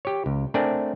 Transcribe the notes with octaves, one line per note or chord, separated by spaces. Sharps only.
G4 C#5
C#2
A3 C4 D4 A#4 D5 G#5